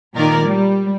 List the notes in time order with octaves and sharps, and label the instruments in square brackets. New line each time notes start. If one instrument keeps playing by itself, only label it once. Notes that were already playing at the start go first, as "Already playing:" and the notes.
[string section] A#2 D#3 A#4 D5
G3